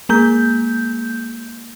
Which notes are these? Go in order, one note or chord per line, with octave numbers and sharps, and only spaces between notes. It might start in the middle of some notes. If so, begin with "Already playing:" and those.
G#3 A#3 G6